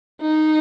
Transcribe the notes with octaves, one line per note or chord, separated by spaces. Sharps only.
D#4